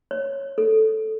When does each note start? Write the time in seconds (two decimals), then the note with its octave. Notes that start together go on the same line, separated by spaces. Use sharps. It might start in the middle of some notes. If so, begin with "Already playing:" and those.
0.11 C#5
0.58 A4